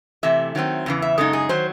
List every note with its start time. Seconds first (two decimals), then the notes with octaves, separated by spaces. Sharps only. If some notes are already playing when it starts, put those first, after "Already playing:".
0.23 C3 E3 A3 E5
0.55 D#3 F#3 A3 C4
0.86 E2 C#3 E3
1.02 E5
1.18 F#2 C#3 G#3 D#4 A4
1.33 G#4
1.49 D#3 F#3 C5